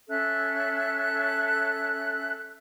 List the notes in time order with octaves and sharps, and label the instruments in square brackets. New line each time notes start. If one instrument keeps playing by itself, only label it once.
[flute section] C#4 A4 E5 F#6